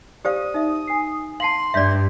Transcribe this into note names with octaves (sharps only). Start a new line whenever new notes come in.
G4 C5 D5 F5 D#6
D#4 E5
G#5 C7
F5 A5 C6 C7 F#7
G2 D5 E5 G6 B6